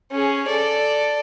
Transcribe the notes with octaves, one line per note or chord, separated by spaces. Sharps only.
C#4 G#4
A4 D5